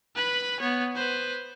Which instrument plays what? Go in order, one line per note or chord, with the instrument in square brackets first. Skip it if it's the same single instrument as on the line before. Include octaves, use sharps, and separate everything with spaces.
[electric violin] B4 B5
B3 C#5
B4 C5